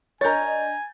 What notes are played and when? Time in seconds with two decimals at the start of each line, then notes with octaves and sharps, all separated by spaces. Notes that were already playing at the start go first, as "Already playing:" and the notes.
0.21 D4 A#4 C#5 D#5 G#5 A#5 G6 A6